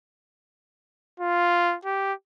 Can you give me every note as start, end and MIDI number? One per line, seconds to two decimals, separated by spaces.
1.20 1.77 65
1.85 2.13 67